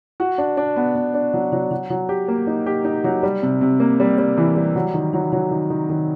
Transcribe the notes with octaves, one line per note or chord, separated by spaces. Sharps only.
F#4
D4
D4
B3
B3
D4
F#3
F#3
F#3
F#3
G4
A#3
D#4
G4
D#4
F#3
G3
C3
C3
A#3
G3
G3
E3
G3
F#3
D#3
F#3
F#3
D#3
D#3
D#3